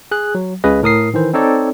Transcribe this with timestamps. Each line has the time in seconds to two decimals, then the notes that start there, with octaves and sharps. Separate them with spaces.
0.11 G#4 F#6
0.35 F#3
0.64 C#2 C#3 G#4 B4 D#5
0.83 A2 A#4 D#6 C7
1.14 D#3 E3 C5
1.33 C4 D#4 A4 C#5 D5